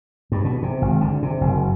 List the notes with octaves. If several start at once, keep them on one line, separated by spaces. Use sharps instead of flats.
G2
B2
C3
G#1
D3
C3
F#1